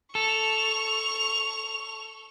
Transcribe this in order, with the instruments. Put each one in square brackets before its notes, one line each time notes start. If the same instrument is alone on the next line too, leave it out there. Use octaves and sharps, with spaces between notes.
[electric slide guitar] A4 [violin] C#6 F7